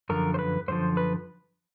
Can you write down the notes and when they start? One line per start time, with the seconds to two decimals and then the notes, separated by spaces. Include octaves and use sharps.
0.09 F#2 D3 F3 A#4
0.34 C5
0.39 B4
0.68 F#2 D3 F3 C5
0.97 B4